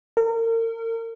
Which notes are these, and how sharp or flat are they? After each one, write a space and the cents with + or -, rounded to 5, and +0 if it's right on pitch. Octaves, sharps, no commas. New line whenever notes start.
A#4 -35